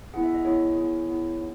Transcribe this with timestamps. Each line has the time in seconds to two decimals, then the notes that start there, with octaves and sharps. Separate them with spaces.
0.14 B3 E4 G#4 F#5
0.24 E5
0.34 D#5
0.45 B3 E4 G#4 C#5
0.76 B3 E4 G#4
1.08 B3 E4 G#4
1.39 B3 D#4